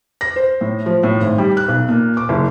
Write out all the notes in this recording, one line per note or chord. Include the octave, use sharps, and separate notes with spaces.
A#6
C5
A2
F3
A2
G#1
G3
F#6
B1
A#2
D6
F#1